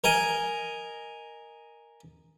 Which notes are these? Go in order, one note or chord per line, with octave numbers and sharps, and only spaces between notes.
A#4 D#5 G#5